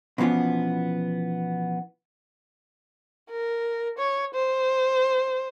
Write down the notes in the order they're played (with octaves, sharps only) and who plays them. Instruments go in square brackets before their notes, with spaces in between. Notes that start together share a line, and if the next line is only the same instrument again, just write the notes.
[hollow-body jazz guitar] B2 E3 F3 B3 C#4
[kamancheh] A#4
C#5
C5